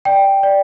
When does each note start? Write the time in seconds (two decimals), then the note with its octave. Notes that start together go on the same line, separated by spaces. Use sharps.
0.05 D5 G5
0.43 D5